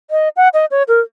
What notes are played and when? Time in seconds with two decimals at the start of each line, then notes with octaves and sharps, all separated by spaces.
0.11 D#5
0.37 F#5
0.54 D#5
0.71 C#5
0.88 A#4